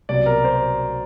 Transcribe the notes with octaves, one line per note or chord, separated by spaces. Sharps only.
C2 B2 F#3 D5
A#4
C5